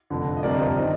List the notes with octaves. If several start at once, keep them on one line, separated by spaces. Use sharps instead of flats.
F1 F2 D3
D#5
G1 F2 C3 G3 A#4 D5
C5 D#5
D#3